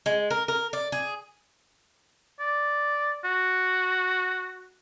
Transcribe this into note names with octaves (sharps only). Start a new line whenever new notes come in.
G#3
A#4
A#4
D5
G#4
D5
F#4